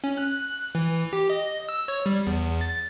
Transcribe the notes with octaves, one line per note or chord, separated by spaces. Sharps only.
C#4
F#6
E3
G4
D#5
E6
C#5
G3
E2
A6